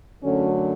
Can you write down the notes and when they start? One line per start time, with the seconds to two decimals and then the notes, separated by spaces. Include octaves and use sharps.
0.23 F#2 D3 F#3 A3 C#4